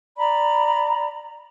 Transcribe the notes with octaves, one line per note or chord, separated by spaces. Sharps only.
D5 A#5 B5